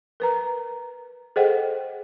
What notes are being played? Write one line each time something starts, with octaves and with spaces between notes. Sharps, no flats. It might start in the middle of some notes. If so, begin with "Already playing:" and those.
A#4 B4 A#5
G#4 A4 C5 D#5 F#5 G5